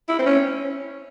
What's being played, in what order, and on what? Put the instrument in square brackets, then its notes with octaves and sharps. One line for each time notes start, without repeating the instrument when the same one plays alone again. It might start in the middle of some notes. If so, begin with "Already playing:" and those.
[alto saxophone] E4
C4
C#4